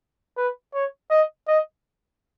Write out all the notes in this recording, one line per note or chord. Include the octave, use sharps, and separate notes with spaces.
B4
C#5
D#5
D#5